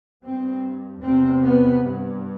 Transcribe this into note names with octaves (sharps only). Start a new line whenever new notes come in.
G2 C4
E2 C3 C4
B3
G2